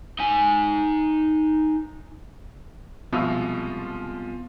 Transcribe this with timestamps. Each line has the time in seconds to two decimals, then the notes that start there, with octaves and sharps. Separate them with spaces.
0.19 D#4 G#5
3.13 C2 B2 F3 G#3 B3 F4 E5